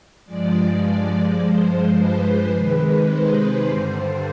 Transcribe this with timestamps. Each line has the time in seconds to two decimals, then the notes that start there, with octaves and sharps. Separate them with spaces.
0.25 G2 F3 G#3 D5
1.39 G2 F3 G#3 C5
1.95 B4
2.51 C3 D#3 G#3
3.08 C5
3.64 G2 D3 G3 C5